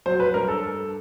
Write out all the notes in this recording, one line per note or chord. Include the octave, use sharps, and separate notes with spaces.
F#3 C5
B4
G2 A#4
A4